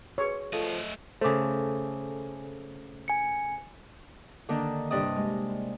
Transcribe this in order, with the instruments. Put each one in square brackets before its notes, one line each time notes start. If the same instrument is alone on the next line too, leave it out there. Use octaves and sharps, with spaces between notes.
[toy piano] F#4 G#4 B4 [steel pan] C#5
[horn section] F3 [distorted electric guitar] A3 D#5 [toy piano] A4
[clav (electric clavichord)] C#3 A3 [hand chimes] A4 G#5 [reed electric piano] C5 D6
[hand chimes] G#5 C#7
[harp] D3 D#3 A#3 D4
G2 C3 D4 D5 D#5 D#6
G#3